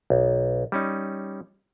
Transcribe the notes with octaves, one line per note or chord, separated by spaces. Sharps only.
B1
G3 C#4 D#4